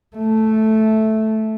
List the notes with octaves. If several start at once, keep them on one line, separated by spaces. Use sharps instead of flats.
A3